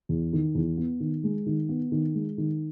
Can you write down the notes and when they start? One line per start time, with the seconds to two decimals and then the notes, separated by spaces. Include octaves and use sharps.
0.09 E2
0.33 D#3
0.55 E2
0.78 B3
1.00 D#3
1.24 G#3
1.46 D#3
1.69 B3
1.92 D#3
2.15 G#3
2.38 D#3